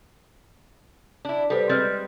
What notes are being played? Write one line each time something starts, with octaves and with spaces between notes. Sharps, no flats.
D4 E4
G3 G4 A4 B4 C5
G3 G#3 C4 B4 F6 A6